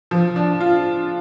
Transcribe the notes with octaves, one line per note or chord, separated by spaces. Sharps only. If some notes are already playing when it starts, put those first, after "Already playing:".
F3
D4
F4